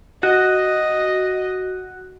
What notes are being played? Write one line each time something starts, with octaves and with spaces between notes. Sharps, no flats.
F#4 D#5